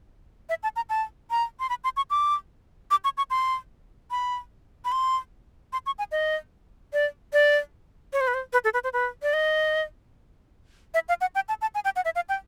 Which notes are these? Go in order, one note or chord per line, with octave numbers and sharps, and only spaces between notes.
E5
A5
A#5
A5
A#5
C6
B5
C6
C#6
D6
D6
C#6
C#6
C6
B5
B5
C6
C6
C#6
G#5
D#5
D5
D5
C#5
C5
B4
C5
B4
A4
B4
C5
B4
D5
D#5
E5
F5
F#5
G5
A5
A5
G#5
G5
F#5
E5
F5
G5